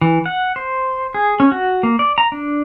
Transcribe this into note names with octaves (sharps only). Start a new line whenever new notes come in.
E3
F#5
C5
G#4
C#4
F#4
A#3
D5
A#5
D4